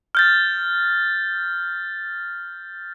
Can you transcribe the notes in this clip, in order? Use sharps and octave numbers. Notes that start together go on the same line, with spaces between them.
F6 G6 A6